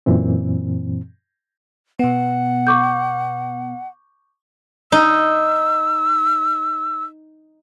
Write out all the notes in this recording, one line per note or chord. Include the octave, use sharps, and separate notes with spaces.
F#2 A#2 E3 C4
B2 B3 F#5
C#6 D6 G6
D#4 E6